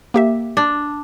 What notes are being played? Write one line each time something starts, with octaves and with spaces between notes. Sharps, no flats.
A#3 G4 E5
D4